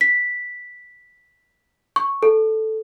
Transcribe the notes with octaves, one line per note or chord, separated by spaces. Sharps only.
B6
C#6
A4